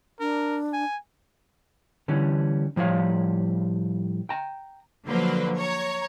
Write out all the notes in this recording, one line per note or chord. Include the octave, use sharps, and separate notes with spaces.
D4 A#4
G#5
D3 E3 G3 C#4
A2 F3 G3 C#5 F5
G5 A#5
D3 F3 F#3 A#3 B4 C5
C#5 A#5